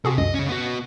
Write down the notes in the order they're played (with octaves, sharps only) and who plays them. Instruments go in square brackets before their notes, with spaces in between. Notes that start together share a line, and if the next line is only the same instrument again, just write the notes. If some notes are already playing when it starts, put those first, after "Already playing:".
[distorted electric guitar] C3 [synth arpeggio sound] F#4 G#4 A4
[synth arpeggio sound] C#2 F#2 [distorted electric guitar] D#5
[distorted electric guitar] C#3 C#4
B3 F#4